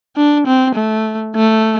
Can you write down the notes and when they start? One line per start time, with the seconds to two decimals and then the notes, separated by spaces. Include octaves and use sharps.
0.17 D4
0.47 C4
0.75 A3
1.36 A3